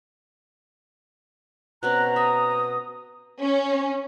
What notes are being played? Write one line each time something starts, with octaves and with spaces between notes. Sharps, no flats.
B2 C4 C#4 A#5 F#6
E5 D#6
C#4